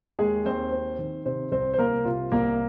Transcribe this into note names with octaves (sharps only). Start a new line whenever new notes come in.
D#2 G#3 G#4
D#2 C4 C5
C4
D#3
C3 C4 C5
C2 C4 C5
C5
C2 A#3 A#4
C3 F4
C2 A#3 A#4